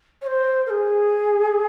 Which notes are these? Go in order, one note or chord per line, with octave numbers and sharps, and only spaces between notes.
C#5
C5
A#4
G#4